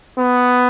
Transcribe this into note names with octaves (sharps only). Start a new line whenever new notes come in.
B3